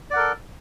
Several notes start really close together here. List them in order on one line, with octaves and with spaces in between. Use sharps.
D5 F#5 A#4 A4